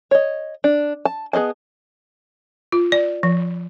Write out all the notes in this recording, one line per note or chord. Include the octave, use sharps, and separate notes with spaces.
C#5 D#5
D4
A5
B3 G#4 D#5 A5
F4
D5
F3